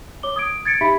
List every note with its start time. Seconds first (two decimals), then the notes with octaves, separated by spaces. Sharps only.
0.23 C#5 D6 G7
0.36 D#6 G#6 D7
0.65 G#6 A6 C#7 D7
0.81 D#4 G4 E5 B5 B6